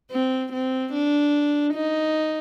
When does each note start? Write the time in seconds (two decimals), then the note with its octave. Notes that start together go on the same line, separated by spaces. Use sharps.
0.11 C4
0.53 C4
0.93 D4
1.74 D#4